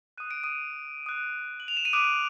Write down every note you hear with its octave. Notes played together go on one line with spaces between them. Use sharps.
D#6 F#6 D#7
D7
D#6 D#7
D#6 F#6
F#7
F7
E7
D#7
D6 D#6 F#6 D7